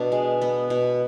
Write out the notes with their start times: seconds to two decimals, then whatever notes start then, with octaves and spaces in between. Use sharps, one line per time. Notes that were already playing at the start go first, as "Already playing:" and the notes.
Already playing: B2 D4
0.12 G#3
0.41 B3
0.70 B2